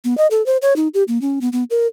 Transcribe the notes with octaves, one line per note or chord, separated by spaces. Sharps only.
B3
D#5
A4
C5
C#5
D#4
G4
A#3
C#4
B3
B3
A#4